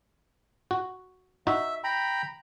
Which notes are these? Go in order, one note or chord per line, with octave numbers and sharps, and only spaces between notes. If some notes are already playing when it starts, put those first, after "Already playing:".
F#4
D#4 F#4 E5
G5 A#5 B5